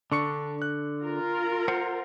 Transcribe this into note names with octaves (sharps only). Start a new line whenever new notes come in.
D3 D4 C#6 C#7
F#6
F4 A#4
C5 F#5